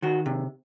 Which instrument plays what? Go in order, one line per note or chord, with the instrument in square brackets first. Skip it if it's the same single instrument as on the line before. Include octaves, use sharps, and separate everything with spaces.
[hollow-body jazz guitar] D#3 F#4
C3